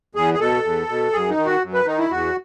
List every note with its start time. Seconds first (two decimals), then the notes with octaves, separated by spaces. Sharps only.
0.15 E2 G#4
0.34 G#4
0.40 B2 A4
0.64 E2
0.88 B2
1.13 F#2 G#4
1.29 D#4
1.37 D#3
1.46 F#4
1.61 F#2
1.73 B4
1.86 D#3 D#4
1.99 E4
2.11 E2 F#4